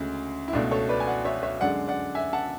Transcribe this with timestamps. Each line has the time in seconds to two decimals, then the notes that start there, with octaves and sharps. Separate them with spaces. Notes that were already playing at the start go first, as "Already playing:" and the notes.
Already playing: D2 C#3 G#3
0.48 E4
0.53 C#2 B2 A3 D4
0.71 A4 C#5
0.89 B4 D5
1.00 G#5
1.07 D5 F#5
1.25 C#5 E5
1.43 C#5 E5
1.61 F#2 D3 G#3 D5 F#5
1.88 D5 F#5
2.15 E5 G#5
2.33 F#5 A5